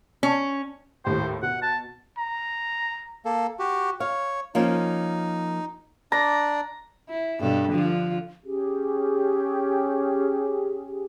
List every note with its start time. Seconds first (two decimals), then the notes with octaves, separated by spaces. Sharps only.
0.23 C#4
1.05 D#2 A2 G4 C5
1.42 B2 F#5
1.62 A5
2.18 A#5
3.25 A#3 A4
3.59 F#4 G4
4.00 C#5 F5
4.55 F3 A#3 C#4 D#4
6.12 D4 D5 A#5
7.09 E4
7.40 G2 B2 A4
7.70 D3 F3 F4
8.44 C#4 G4 G#4